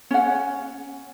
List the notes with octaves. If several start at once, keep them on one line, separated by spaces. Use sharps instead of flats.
C#4 F#5